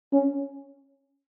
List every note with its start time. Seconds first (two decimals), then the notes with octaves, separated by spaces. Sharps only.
0.13 C#4